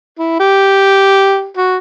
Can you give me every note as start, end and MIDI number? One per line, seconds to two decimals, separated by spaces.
0.19 0.36 64
0.40 1.48 67
1.57 1.78 66